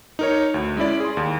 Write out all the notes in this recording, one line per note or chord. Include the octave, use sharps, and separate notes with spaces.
D#4 A#4 C#5
D2
G#3 C#4 E4 D5
G#4 C6
D#2